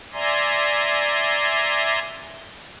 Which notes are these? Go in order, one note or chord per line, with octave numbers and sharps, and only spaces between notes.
D5 E5 G#5 A#5 C6